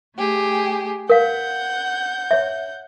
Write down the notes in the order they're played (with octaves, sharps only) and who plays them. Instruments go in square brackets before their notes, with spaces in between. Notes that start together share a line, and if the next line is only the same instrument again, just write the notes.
[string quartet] A3 G4 G#4
[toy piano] A#4 F5 [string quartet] F#5 G6
[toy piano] C#5 E5